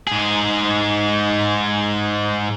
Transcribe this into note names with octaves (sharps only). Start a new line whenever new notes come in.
G#2 G#4